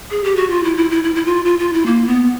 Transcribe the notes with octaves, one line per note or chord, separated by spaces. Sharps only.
G#4
G4
F#4
F4
E4
E4
E4
E4
E4
F4
F4
F4
E4
A#3
B3